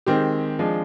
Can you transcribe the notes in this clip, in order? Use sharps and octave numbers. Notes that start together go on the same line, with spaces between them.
D#3 G#3 C4 G4
F3 G#3 D4